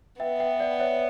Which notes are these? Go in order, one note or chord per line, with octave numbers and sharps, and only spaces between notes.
B3 E5 G5
E5 G5
D5 F#5
C#5 E5